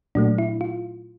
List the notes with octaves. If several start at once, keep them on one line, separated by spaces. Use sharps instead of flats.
A#2 F#3 A3 D4
E4
F4